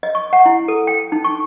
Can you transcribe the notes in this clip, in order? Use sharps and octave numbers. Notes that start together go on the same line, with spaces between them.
D#5
C#6
F#5
E4
A4
G5
D#4
C#6